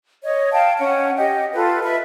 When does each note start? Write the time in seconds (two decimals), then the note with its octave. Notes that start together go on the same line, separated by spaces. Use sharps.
0.24 C#5 D#5
0.53 F5 G5 A5
0.78 C#4 F#5
1.16 G4 D#5
1.53 F4 A4 B4
1.83 B4 E5